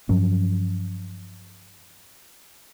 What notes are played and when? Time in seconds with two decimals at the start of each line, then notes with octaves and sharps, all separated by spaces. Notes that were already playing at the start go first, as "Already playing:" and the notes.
0.09 G2 F3 F#3 C#4